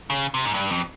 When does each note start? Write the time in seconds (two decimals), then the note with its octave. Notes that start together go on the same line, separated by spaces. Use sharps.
0.10 C#3
0.34 C3
0.45 G#2
0.54 G2
0.70 F2